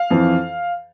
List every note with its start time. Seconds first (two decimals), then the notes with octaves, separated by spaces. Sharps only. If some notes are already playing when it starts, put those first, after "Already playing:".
Already playing: F5
0.11 F2 E3